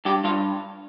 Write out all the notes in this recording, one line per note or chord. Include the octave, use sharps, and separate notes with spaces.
G2 G4
G2 F4